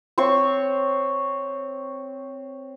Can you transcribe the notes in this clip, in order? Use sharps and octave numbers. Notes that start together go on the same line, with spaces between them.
C4 C5 C#5 C#6